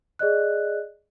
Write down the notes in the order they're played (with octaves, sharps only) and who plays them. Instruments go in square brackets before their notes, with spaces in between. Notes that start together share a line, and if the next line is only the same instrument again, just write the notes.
[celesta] G#4 D5 D#5 F#6